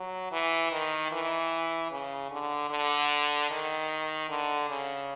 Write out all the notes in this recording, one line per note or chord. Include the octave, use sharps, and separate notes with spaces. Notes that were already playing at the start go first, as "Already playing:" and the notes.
Already playing: F#3
E3
D#3
E3
C#3
D3
D3
D#3
D3
C#3